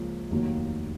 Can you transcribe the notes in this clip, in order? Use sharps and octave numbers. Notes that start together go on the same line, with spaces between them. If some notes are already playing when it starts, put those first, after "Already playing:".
Already playing: C#2 C#3 F3 A#3
F1 D#2 D#3 F#3 A#3